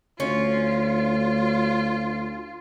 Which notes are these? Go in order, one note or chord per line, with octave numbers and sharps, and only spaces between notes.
D2 C#4 F4